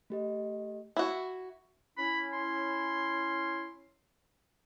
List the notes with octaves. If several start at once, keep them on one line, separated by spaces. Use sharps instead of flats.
A3 G4 D#5
E4 F#4
C#4 E4 B5
C6